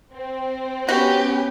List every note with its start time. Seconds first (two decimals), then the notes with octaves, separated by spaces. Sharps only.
0.13 C4
0.89 B3 C#4 F#4 G4